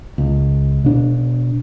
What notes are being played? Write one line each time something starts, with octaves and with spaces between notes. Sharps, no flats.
C#2
B2 D4